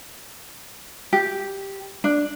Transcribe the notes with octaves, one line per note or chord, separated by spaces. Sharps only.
G4
D4